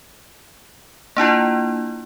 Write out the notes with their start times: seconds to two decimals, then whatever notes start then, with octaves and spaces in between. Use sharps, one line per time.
1.17 A#3 D4 E4 F4